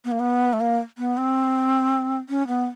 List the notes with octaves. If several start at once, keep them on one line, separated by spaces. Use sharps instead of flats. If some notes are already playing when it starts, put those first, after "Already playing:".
B3
A#3
B3
A3
A#3
B3
C4
C#4
B3